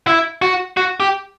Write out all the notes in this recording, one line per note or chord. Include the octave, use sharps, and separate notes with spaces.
E4
F#4
F#4
G4